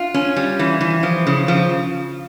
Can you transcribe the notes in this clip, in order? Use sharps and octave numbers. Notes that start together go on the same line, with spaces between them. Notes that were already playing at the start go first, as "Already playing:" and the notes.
Already playing: F4
C#4
G3
E3
E3
F3
C#3
F3